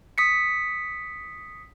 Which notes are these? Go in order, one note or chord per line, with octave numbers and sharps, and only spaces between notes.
D#6 B6 C#7